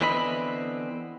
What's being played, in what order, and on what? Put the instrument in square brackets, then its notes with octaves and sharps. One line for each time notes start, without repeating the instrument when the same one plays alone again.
[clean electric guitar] D3 E3 B3 C4 D#5 B5